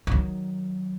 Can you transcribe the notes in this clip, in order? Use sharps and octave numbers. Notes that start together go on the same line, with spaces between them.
D#3 F#3